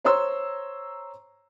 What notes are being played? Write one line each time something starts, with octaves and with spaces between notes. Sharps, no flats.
C5 C#5 A#5 C6 E6